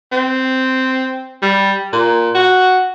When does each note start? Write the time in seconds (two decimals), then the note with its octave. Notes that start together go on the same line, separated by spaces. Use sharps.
0.12 C4
1.42 G3
1.93 A#2
2.35 F#4